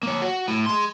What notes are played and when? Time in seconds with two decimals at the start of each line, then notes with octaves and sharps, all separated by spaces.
0.03 A#3 C#5
0.22 F#4
0.48 A2
0.66 G#4 C6